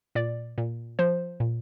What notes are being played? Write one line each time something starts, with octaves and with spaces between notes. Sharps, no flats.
A#2 D5
A#2
F3 C5
A#2